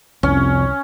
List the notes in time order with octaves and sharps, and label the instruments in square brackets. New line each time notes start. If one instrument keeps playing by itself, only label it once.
[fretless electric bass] C2 [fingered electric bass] F2 C3 [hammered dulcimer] C#4